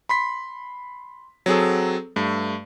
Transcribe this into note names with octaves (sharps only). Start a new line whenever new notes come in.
B5 C6 B6
F#3 C4 G#4 A4
G2 A3